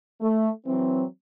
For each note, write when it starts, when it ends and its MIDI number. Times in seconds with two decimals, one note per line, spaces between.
0.21 0.48 57
0.66 1.04 52
0.66 1.04 54
0.66 1.04 60